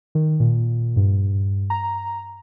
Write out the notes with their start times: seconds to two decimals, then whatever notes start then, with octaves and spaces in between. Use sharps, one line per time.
0.15 D#3
0.40 A#2
0.96 G2
1.70 A#5